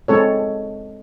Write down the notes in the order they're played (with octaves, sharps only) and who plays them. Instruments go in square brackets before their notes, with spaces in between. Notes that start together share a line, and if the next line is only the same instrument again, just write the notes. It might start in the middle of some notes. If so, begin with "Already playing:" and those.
[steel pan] G#3 C4 A4 C#5